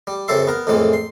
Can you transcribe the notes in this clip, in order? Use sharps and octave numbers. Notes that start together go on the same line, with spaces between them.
G3
F#2 C#3 C4 A4 E5 C6
B3 A#4
F2 A2 E3 G#3 A#3
C6